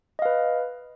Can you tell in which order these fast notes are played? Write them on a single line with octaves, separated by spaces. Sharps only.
D#5 F5 B4